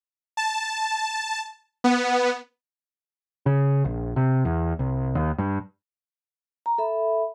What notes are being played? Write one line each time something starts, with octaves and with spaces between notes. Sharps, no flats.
A5
B3
C#3
A#1
C3
E2
C2
D#2
G2
A#5
A4 E5 B5